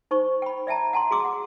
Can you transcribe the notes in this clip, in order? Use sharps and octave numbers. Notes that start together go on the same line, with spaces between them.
D#4 C5 C#6
G5 B5
D5 E5 G5 A5 A#5
F#5 A5 A#5 C6
F#4 G#4 C6 D6 E6
F#5